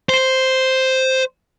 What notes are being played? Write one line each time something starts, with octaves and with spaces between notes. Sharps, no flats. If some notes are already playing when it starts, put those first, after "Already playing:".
C5